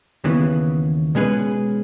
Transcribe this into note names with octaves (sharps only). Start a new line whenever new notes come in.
D#2 C#3 E3 B3
B2 G#3 C#4 G#4 B4